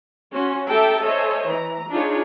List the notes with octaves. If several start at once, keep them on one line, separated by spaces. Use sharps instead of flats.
C#4 F#4 C6
G4 A4 E5 G5 A5 A#5
A4 C5 C#5 D#5 E5 G#5
E3 A#5
D4 D#4 F4 G#4 C#5